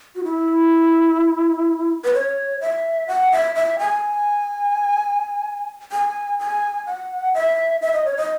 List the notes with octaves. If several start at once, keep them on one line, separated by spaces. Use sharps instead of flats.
F#4
E4
B4
C#5
E5
F#5
E5
E5
G#5
G#5
G#5
F#5
E5
E5
D#5
C#5
D#5